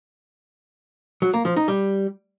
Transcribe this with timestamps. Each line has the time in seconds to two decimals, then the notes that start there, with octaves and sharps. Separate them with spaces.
1.22 F#3
1.33 A#3
1.45 F3
1.56 D#4
1.68 G3